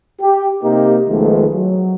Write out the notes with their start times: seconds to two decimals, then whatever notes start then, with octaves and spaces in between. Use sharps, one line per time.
0.21 G4
0.63 C3 A#3 D#4 G4
1.08 B1 D#3 F3 G#3 A3 B3
1.54 F#3